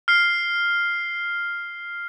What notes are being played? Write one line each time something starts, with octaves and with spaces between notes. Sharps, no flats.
F6 C7